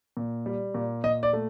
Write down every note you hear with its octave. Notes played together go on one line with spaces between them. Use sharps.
A#2
G3
A#2
A#2 D#5
D5
A3